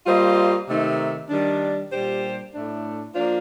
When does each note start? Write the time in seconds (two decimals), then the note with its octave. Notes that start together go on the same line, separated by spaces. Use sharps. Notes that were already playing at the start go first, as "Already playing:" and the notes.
0.06 G3 A#3 F4 C5 D#5
0.68 C3 D#3 A3 D#4
1.30 D#3 G3 D4
1.91 A#2 G3 D4 G4 C5
2.53 A2 A3 D4
3.15 F3 A#3 D4 F4 C5